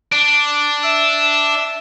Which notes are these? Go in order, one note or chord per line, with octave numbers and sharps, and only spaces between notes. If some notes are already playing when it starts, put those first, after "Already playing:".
D4
E5 E6